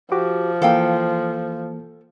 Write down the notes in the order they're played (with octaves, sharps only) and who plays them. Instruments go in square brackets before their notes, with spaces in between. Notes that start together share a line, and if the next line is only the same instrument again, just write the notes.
[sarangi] F3 [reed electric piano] F#4 G4 D6
[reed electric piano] E3 A#3 [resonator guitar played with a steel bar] A4 F5 G5